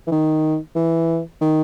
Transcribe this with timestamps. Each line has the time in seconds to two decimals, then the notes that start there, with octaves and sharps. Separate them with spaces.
0.07 E3
0.11 D#3
0.75 E3
1.41 D#3